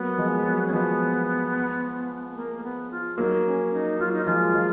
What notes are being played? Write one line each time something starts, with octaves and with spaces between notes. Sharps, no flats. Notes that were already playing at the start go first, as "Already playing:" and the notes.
Already playing: F#3 A#3 B3
F3 G#3
F#3
C#4
F3 G#3 B3
B3
A#3
A#3
B3
F4
F#3 A#3 D#4
C#4
D#4
F#3 F4
D#4
F3 G#3 F4
F3 G#3